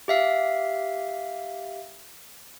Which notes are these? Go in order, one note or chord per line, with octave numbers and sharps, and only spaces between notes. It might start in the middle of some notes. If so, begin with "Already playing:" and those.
G4 E5 F5